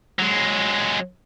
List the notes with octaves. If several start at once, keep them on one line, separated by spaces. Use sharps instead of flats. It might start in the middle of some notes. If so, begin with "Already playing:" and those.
F#3 G#3